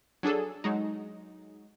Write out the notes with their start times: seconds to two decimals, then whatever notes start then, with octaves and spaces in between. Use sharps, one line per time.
0.23 F#3 D4 G#4 A4
0.64 F#3 G#3 D#4